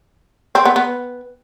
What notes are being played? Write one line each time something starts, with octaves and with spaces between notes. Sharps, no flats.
C4
B3
B3